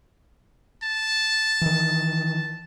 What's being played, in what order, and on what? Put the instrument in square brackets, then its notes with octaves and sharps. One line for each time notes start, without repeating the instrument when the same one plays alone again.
[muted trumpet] A5
[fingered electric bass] D#3 E3